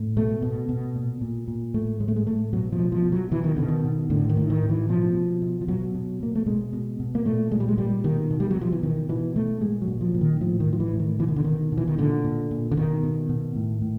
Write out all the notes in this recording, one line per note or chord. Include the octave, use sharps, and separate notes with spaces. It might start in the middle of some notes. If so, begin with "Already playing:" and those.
Already playing: A2
B2 A3
B2
B2
A#2
A#2
A#2
A2 A3
A2 G#3
A3
G#3
A2 A3
B2 F#3
F3
B2
F3
B2
F#3
B2 E3
D#3
B2 D3
D#3
B2
A2 D3
D#3
A2
D#3
A2
E3
B2 F3
B2
B2
F3
B2 F#3
B2
B2 A#3
A3
B2 G#3
B2
B2
A#3
A#2 A3
A#2 G#3
G3
G#3
A#2 G3
B2 D#3
B2
G3
F#3
B2 F3
E3
B2 D#3
B2 E3
B2 A3
A#2 G#3
F#3
A#2
F3
A#2
D#3
A2 F3
D#3
A2
F3
E3
A2
D#3
B2 E3
D#3
D3
B2 D#3
B2
E3
D#3
A#2 D3
A#2
A#2
D3
B2 D#3
B2
B2
A2
A2